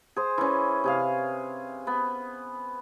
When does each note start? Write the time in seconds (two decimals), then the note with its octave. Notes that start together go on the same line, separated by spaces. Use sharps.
0.16 G#4 C5
0.38 E3 C#4
0.84 C3 G#4 F5
1.87 B3